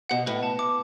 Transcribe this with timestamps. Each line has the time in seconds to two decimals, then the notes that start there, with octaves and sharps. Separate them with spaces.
0.09 B2 F#5
0.26 A2 B4
0.43 A5
0.59 D6